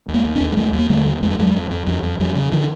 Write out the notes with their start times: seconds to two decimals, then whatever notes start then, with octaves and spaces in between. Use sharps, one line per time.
0.08 D#2
0.14 G#3 A#3
0.25 D#2
0.35 C4 D4
0.41 D#2
0.52 G#3
0.57 D#2 G3 A3
0.73 D#2
0.79 A#3
0.90 D3 G3 A3
1.06 D#2
1.23 F2 G#3
1.31 G3
1.39 F2 F#3 G#3
1.55 F2
1.71 F2
1.87 F2 F3 G3
2.03 F2
2.20 F2 F3 G3
2.35 C#3
2.52 D3 D#3 F3